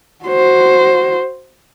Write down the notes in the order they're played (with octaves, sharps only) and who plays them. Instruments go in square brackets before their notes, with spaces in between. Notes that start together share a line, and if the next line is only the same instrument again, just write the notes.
[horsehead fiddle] F#4 C5